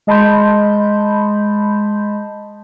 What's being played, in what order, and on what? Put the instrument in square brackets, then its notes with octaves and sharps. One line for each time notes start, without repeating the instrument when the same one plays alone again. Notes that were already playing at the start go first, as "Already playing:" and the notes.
[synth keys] G#3 D#5 A5 B5 C6 G6